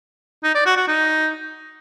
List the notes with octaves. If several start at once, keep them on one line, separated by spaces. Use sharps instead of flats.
D#4
D5
F#4
F#4
D#4